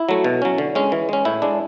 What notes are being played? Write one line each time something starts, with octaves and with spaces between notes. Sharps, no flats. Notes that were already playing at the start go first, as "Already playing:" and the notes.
Already playing: E4
F#3 A3
B2
F#3 C#4
D3
G#3 C#4
E3
G#3 C#4
A2 E4
G#3 D4